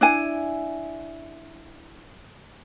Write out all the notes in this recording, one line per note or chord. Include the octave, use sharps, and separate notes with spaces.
D4 E4 G#5